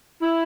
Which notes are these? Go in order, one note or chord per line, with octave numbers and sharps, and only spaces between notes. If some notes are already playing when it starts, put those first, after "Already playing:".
E4